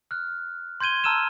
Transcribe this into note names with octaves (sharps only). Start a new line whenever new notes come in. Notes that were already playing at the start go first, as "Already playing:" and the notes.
F6 F#6
C6 G6 G#6 D#7 G7
A5 A#5 E6 F6 D#7 E7